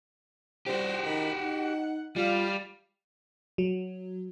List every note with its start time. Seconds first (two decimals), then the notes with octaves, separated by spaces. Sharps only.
0.66 G3 F#4 G4 C5
1.05 D#3 B5
1.40 D#4 F#5
2.16 G3 F4 F5
3.58 F#3